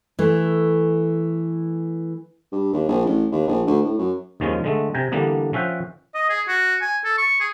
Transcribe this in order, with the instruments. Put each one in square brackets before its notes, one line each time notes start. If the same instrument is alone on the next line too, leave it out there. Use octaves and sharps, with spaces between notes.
[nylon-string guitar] E3 A3
[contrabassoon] G2
D#2
A#1
A1
D#2
A#1
D2
A2
F#2
[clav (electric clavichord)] D#2 D#3 F3 G#3 C#4
D3 G#3 A3
C3 G5 G#5 A#5
D3 E3 G3 A#3 B3 D4
F3 C#4 E5 F#5 G5
[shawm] D#5
G#4
F#4
G#5
A4
C#6
G#4